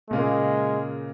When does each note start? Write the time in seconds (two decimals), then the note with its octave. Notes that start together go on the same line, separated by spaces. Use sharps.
0.11 A#2 C#3 G#3 A#3